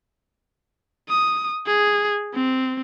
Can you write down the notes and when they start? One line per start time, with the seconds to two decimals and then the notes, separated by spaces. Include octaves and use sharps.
1.09 D#6
1.67 G#4
2.34 C4